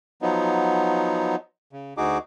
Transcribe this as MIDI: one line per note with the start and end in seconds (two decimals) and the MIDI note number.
0.22 1.36 53
0.22 1.36 54
0.22 1.36 59
0.22 1.36 63
1.73 1.94 49
1.97 2.18 38
1.97 2.18 63
1.97 2.18 66
1.97 2.18 68
1.97 2.18 86